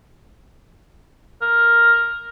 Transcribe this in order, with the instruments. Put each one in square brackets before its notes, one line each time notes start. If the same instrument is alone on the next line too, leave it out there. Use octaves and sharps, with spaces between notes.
[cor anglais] A#4